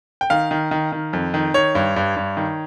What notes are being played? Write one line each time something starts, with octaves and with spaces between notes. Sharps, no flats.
G5
D#3 F5
D#3
D#3
D#3
F2
D#3
D#3 C#5
G2
G2
G2
D#3